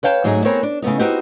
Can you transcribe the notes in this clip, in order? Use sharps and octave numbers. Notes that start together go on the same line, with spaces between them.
B4 C#5 F5 G5 A5
G#2 F#3 G#3 A3 D#4 G#4
B3 C4 G#4 A#4 C5 C#5
D4
C#3 A3 B3 D#4
B3 C4 D#4 F#4 G4